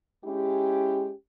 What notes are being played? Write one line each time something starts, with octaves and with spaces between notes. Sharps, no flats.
G#3 C#4 E4 G4